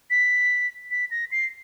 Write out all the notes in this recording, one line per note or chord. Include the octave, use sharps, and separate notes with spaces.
B6
B6
A#6
C7